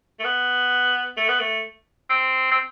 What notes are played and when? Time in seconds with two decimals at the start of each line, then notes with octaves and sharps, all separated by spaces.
0.19 A3
0.24 B3
1.17 A3
1.29 B3
1.40 A3
2.10 C4
2.51 C4